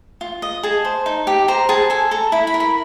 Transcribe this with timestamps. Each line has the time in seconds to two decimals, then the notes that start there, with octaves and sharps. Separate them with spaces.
0.21 F4
0.42 D#5
0.63 G#4 A5
0.85 C5
1.06 D#4
1.27 G4
1.48 C5 A#5
1.69 G#4 A5
1.90 A4 G#5
2.11 A4 A#5
2.32 E4 B5
2.47 B5
2.54 A#4
2.60 B5